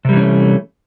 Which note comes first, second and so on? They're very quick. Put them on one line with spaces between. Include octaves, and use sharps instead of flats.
C3 G3 E3 C#4 A3